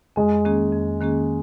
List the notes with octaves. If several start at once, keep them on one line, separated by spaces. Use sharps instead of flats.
F2 G#3
D#3 A#3 C#4 G#4
F2
D#3 A#3 C#4 G#4